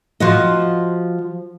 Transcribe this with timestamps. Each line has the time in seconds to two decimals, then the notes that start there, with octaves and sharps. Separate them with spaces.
0.20 F3 F#4 D#5